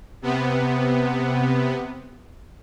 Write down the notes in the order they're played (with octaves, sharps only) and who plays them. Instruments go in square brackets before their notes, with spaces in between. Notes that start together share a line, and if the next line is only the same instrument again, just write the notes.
[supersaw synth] C3 B3